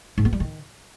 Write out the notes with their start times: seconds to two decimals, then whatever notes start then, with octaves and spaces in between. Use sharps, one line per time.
0.18 G#2
0.25 B3
0.33 G3
0.40 D#3